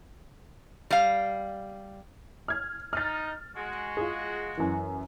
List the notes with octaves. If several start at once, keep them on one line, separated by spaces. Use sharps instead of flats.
G3 F5
F6 G#6
D#4 F6 A6
G#3 F#4
F4 G#4
F#2 E3